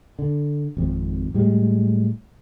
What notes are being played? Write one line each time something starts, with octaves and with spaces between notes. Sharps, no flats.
D3
G#1 F2
A2 G3 G#3